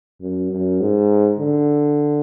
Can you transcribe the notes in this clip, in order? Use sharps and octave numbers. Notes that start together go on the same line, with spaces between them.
F#2
F#2
G#2
D3